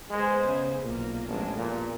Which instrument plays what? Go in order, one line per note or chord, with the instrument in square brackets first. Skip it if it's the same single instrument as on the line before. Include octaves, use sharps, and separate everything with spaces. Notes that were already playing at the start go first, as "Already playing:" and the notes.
[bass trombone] G#3 [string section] B3 G#4 C5
[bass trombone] C#3
[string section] B1 A#3 [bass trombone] A#2
[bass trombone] A1 [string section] F3 G#3 D4
[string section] E2 [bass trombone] A#2